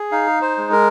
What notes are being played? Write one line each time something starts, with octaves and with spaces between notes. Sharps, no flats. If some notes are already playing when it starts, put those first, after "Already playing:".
Already playing: G#4
D#4 F5
C5
G#3
A#4